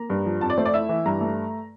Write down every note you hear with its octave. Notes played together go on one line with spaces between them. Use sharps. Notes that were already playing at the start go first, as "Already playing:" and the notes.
Already playing: A#3 A#5
G2
F3
F2 A5
D5
A3 C5
D5
E4 E5
E3
G2 A#5
A3